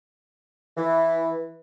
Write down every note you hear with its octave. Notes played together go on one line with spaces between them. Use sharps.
E3